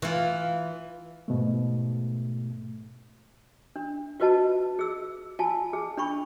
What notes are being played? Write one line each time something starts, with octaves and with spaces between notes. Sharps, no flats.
E3 F4
G#2 B2 A3
D4
F4 F#4 B4 D#5 A5
G#4 E6
F4 G#5 A5
G#4
D4 B5 C#6